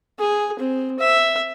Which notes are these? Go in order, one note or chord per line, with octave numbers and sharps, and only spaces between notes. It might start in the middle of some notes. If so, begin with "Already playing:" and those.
G#4
C4
E5